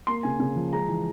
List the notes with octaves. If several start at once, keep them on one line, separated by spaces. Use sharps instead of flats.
A#3 C6
C#3 G#5
C#3
F3
G#3 A#5
E3